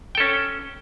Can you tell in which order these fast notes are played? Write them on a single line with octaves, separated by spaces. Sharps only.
G5 A4 C#4